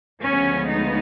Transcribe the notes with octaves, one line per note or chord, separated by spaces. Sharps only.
D2 C#3 F3 G#3 B3 C#4
D#4